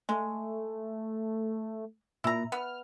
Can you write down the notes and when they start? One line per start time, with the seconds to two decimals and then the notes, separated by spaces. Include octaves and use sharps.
0.09 G#3 A3
2.24 A#2 E4 A#5
2.52 B3 F6